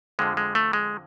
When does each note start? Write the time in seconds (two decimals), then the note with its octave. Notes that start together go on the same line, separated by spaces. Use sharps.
0.19 F2 D3 F3 G#3
0.37 G#3
0.55 A3
0.73 G#3